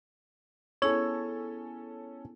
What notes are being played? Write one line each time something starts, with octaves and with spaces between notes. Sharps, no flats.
B3 C#4 E4 G#4 A4 C#5